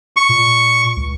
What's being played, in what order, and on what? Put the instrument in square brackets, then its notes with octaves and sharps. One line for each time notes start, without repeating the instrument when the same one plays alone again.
[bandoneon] C#6
[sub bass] A#2
C#2